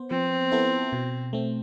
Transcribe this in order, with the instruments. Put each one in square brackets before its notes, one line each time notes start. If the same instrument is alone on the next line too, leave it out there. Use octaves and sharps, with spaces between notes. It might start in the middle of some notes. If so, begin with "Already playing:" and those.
Already playing: [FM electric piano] B3 C5
[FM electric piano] F3 [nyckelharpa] C4
[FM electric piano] B3 E4 A4 C5
B2
A3 C4